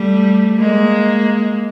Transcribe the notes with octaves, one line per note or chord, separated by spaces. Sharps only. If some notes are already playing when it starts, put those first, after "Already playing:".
Already playing: G3 A3
G#3 A#3